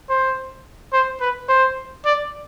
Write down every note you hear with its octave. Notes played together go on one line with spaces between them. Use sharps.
C5
C5
B4
C5
D5